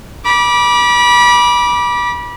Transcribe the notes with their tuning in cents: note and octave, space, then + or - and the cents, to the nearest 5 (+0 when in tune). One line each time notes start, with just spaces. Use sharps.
B5 -30 D6 +0